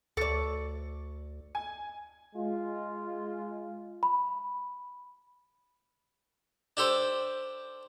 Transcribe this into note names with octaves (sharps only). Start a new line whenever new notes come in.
D2 A4 D5 C#6
G#5
G#3 F4
B5
D4 G4 A4 C5